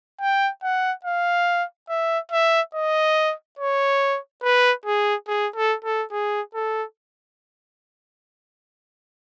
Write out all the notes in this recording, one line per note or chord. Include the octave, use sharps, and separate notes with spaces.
G5
F#5
F5
E5
E5
D#5
C#5
B4
G#4
G#4
A4
A4
G#4
A4